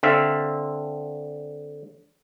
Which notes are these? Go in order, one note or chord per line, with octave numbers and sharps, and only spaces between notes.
D3 C4 E5 F5